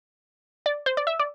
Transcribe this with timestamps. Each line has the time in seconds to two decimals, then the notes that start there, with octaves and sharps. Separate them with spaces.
0.66 D5
0.86 C5
0.97 D5
1.07 E5
1.19 D5